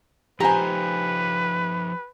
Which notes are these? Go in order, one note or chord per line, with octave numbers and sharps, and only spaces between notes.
F3 D#4 F4 G4 B4 C5 G#5 A#5